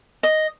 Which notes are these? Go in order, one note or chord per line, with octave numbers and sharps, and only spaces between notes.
D#5